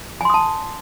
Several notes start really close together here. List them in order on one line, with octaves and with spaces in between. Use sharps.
G#5 C6 D#6 A5